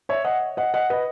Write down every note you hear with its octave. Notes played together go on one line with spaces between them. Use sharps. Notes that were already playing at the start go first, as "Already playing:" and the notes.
C#5 E5
D#5 F#5
D#5 F#5
D#5 F#5
B4 D#5